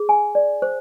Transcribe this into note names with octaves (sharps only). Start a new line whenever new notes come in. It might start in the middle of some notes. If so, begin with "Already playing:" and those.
Already playing: G#4
G#5
D5
C5